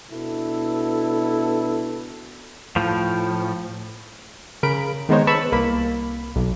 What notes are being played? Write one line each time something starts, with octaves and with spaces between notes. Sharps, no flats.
B2 B3 D4 E4 A4
A2 F3
C#3 A#4 B5 D7
D#3 G#3 B3 D#4 C5 C#5
B4 A5 B5 C#6 E6
C2 A#3 B5
B1